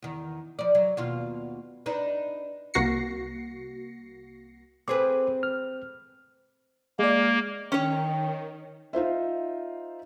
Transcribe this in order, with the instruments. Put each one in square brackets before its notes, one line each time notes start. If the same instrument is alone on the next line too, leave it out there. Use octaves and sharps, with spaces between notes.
[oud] E2 D#3
F3 D5
F#3
D#2 B2 F4
D4 D#4 B4
[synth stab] C2 A#3 F#4 A#6 C7 C#7
[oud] C4 G#4 B4 [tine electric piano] A4 C5 D6
[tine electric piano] F6
[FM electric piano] G#3 D5 [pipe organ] A#3
[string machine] D#3 [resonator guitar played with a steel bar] C#4 C#5 [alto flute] G5
[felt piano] D#4 F4 C5 E5